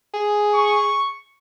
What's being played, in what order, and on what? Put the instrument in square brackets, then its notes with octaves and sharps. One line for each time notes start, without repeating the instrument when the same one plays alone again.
[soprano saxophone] G#4
[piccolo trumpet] C#6